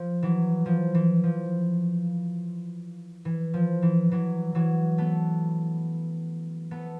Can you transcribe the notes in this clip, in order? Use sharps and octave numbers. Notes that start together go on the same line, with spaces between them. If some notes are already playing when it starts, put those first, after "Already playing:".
Already playing: F3
E3 F#3
F3
E3
F3
E3
F3
E3
E3 F#3
E3 F#3
A3 B3
A3 B3